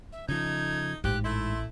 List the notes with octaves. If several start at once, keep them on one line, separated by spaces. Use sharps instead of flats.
E5
C#3 F3 A3 D#4 G#6
A1 G#2 F3 G4 F#6
A3 E4 C6